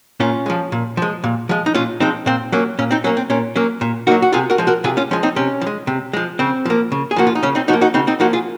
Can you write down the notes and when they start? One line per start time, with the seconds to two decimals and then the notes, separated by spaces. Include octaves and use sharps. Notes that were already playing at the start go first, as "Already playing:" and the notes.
0.20 A#2 C#4 F4
0.46 F3 G#3
0.72 A#2
0.97 F3 G#3
1.24 A#2
1.49 F3 G#3
1.66 D#4
1.75 A#2 C#4 F4
2.00 F3 G#3 C4 D#4
2.26 A#2 C4
2.52 F#3 A#3 C#4
2.79 A#2 C#4
2.91 C4 D#4
3.04 F#3 A#3 C#4
3.17 C4
3.30 A#2 C#4
3.56 F#3 A#3 C#4
3.81 A#2
4.07 F#3 A#3 D#4 F#4
4.22 F#4
4.33 C3 F4 G#4
4.50 F#4 A#4
4.58 F3 G#3
4.67 F#4 A#4
4.84 C3 F4 G#4
4.97 C#4 F4
5.11 F3 G#3 C#4
5.23 C4 D#4
5.36 C3 C#4
5.61 F3
5.67 G#3
5.87 C3
6.13 F3 G#3
6.39 C#3 C4
6.65 F3 A#3
6.92 C#3
7.11 G#4
7.16 F3 A#3 F#4
7.27 F4
7.35 D#4
7.43 C#3 C#4
7.55 C4 D#4
7.68 F3 D#4 F#4
7.73 A#3
7.81 D#4 F#4
7.94 C#3 C4 D#4
8.07 C4 D#4
8.20 F3 A#3 D#4 F#4
8.33 F4 G#4